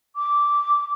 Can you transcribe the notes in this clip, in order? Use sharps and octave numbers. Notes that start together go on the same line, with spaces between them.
D6